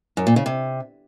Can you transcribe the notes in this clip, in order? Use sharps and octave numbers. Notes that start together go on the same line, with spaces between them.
F#2
A#2
C#3
C3